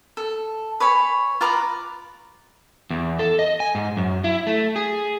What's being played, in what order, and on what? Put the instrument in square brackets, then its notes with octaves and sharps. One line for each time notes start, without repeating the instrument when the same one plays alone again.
[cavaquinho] A4
B4 C#5 G#5 B5
F4 B4 A#5 D6
[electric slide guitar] E2
A4
D#5
G#5
G#2
F#2
E4
A3
G#4